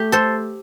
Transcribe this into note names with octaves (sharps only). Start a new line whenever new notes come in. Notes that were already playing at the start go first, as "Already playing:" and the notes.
Already playing: A3 G4
A4 C5